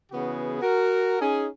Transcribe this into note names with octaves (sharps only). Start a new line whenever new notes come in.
C#3 E3 B3 F#4 G#4
F#4 A#4
C#4 D#4 G#4